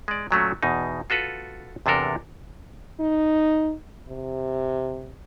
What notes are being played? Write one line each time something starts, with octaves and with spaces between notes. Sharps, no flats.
G#3 D5
A#2 F#3 A3 C#4
E2 B2 D#4
F4 F#4 A4 B4
E2 C3 D4 A4 A#4
D#4
C3